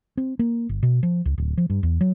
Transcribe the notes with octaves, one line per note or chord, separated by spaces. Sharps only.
C4
A#3
G1
B2
F3
C#2
D1
F3
G2
E2
F#3